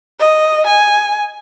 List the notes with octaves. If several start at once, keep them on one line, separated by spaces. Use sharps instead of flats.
D#5
G#5